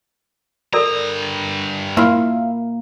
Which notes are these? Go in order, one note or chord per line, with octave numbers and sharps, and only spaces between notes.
G2 A4 A#4 D5 A#5
A#3 E4 F4